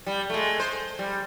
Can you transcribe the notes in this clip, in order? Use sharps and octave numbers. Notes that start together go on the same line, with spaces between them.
G3
G#3 A3
C5
G3